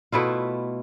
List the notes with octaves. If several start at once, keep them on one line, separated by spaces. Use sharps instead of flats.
B2 A3 E4 F4